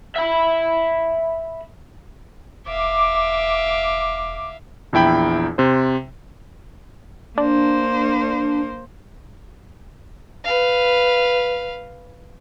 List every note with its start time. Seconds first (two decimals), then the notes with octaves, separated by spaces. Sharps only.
0.16 E5 B5
2.67 E1 E5 F5 D6
4.93 A#1 E2 E4 G5 B5
5.58 C3 C5
7.38 A#3 D4 C5
10.44 B4 F5